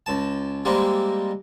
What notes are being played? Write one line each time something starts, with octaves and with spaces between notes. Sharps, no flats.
C#2 A5
G3 G#3 A#3 C4